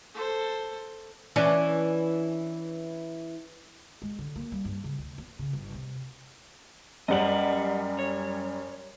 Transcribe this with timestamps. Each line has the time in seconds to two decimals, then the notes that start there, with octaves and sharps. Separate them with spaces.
0.14 A4 C5
1.36 E3 C#4 D4
4.02 G#3
4.19 D3
4.36 A#3
4.52 G3
4.65 G2
4.84 C#3
4.98 D2
5.18 B3
5.39 C#3
5.53 G1
5.74 C3
7.08 F#2 G3 D#5 F#5 F#7
7.99 C#5